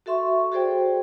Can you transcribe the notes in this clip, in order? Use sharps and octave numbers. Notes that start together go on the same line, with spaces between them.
F#4 A4 E5 C6 C#6
F#4 G#4 A4 C5 D5 G5